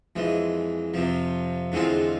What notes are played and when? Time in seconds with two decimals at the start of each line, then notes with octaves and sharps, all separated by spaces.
0.16 F2 E3 G#3
0.94 F2 C3 F3
1.72 E2 D3 G#3 C4 F4